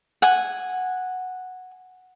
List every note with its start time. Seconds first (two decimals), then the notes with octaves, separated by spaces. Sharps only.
0.22 F#5 G#5